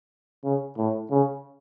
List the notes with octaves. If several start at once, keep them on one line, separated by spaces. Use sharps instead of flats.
C#3
A2
C#3